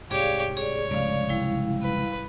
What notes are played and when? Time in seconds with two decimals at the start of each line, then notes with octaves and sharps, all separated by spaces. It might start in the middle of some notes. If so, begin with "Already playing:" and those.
0.11 C2 G#2 G4 G#4 C#5 D5 F5
0.57 G#4 C#5 D5
0.91 F1 C#2 D5 F5
1.29 G3 E4 F5
1.82 B4